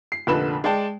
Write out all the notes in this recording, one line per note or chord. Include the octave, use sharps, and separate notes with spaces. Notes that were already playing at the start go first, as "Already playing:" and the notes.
C7
F1 A#2 D3 B4 B5 E7
G#3 D5 G5 A5